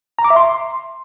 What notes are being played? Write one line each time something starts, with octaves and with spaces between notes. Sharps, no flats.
A#5
D6
E5
C6